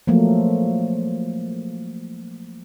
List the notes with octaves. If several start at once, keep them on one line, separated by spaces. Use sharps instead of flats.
F3 F#3 A3 A#3